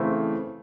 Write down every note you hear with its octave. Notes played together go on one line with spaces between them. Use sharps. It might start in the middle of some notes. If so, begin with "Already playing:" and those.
Already playing: C#3 E3 A3 C4